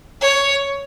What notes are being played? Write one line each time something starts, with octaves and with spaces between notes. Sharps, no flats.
C#5